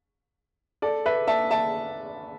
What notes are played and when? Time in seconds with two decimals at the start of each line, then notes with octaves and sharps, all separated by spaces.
0.82 A4 D5
1.06 B4 E5
1.27 E5 A5
1.51 E5 A5